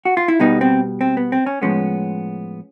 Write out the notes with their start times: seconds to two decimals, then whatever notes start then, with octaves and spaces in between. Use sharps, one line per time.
0.05 F#4
0.17 F4
0.28 E4
0.40 B2 G3 B3 D#4
0.61 C4
1.01 C4
1.17 B3
1.32 C4
1.46 C#4
1.62 A2 F3 G#3 B3 C#4